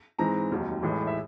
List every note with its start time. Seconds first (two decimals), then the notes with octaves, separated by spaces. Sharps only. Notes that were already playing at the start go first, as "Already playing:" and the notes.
0.19 G#2 E3 G#3 C4 A#5
0.51 F1 D#2 D#3 F#3
0.83 A1 A2 E3 G#3
1.07 E5